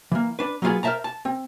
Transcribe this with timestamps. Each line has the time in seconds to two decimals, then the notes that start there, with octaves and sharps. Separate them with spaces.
0.12 E3 A#3
0.39 D4 B4
0.62 F#3 A#3 B3 D4 F4 G#4
0.83 A#4 C5 D#5 E5 A5 A#5
1.04 A5
1.25 C4